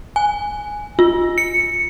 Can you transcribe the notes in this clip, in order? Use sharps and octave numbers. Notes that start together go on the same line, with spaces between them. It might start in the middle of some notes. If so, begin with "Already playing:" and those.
G#5
F4
C#7